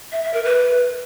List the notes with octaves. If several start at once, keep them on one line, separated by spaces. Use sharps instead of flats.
E5
E5
A#4
B4